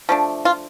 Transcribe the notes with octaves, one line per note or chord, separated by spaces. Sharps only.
F3 A3 D4
F4